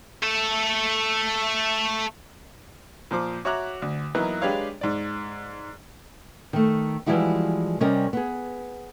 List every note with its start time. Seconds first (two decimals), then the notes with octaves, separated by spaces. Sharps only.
0.23 A3 A4
3.11 A#2 F3 C5 D6
3.45 F#4 C#5 E5 A#5 D6 F#6
3.82 D2
4.15 E3 F#3 A#3 B3 D#4 E4
4.42 G#3 D4 G4 B4 C#5 F5
4.81 G#2 D5
6.53 D#3 A3
7.06 E3 F3 G3 G#3 E4 F#4
7.80 C3 G3 C#4 G4 A#4 D#5
8.13 B3 G#4